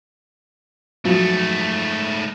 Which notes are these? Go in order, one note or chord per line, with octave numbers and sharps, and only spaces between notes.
G#2 F3 F#3 A3